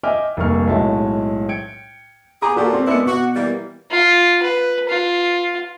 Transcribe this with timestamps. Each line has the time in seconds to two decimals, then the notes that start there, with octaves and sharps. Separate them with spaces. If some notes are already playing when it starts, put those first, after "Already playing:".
0.03 D#5 E5 G5 G#5 D6 F6
0.37 F1 G2 A#3 C#6 F6
0.67 B1 A2 G#3 F#4 E5 A5
1.49 G5 G#6 C#7 D7
2.42 B3 G4 G#4 A#5 D6
2.56 A#2 F#4 G4 A4
2.73 C4
2.87 G#3 B3 D4 E4 C#7
3.06 B2 F#4
3.36 E3 G3 A#3
3.91 F4
4.43 B4
4.89 F4